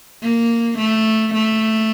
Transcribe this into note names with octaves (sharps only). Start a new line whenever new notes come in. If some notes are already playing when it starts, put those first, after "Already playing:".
A#3
A3
A3